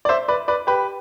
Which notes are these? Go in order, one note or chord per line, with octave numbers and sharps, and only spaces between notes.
D5
C5 E5
B4 D5
B4 D5
G4 B4